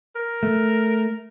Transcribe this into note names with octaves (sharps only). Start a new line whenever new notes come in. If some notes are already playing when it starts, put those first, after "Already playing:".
A#4
A3